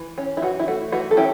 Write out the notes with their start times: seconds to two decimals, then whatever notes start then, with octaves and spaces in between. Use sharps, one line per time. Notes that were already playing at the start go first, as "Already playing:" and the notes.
Already playing: E3
0.18 C#4
0.37 E4
0.42 E3 F#4
0.60 E4
0.68 A3 F#4
0.92 E3 F#4
1.11 A4
1.17 C#4 E4 G4